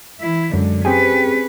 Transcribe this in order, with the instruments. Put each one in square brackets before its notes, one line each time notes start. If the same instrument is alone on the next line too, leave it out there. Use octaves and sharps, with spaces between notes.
[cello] E3 E4
[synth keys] F#2 [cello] D3 G#3
[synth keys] C4 G4 G#4 [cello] C#4 B4